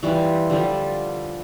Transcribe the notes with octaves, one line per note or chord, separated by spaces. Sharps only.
E3 G3 E4 F4
D3 F3 G3 D4